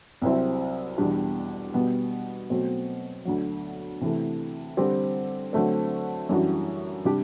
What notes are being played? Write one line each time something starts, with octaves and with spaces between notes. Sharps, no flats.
C2 C3 F#3 C4 E4
E2 B2 G3 D4 G4
B2 G3 B3
B2 F#3 A3 C4
D2 D3 F#3
C3 E3 A3
D3 G3 C4 G4
D3 F#3 A3 C4
F#2 E3 G3 D4 F#4
C3 G3 D4 G4